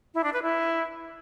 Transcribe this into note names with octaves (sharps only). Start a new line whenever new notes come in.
E4
D4
B4
E4